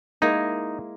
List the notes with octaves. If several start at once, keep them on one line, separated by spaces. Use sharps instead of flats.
G#3 A#3 D#4 E4